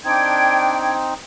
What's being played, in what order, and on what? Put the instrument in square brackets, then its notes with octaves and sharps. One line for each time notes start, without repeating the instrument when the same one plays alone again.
[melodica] C4 D#4 [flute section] D4 G5 G#6